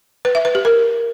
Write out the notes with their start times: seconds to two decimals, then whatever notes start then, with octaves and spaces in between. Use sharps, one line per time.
0.25 B4
0.35 E5
0.45 B4
0.55 G4
0.65 A#4